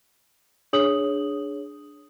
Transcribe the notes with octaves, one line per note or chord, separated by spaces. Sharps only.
D4 G#4 C#5 D#6 F#7